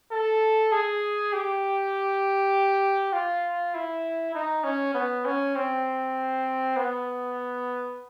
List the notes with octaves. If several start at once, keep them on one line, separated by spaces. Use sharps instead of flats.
A4
G#4
G4
F4
E4
D#4
C#4
B3
C#4
C4
B3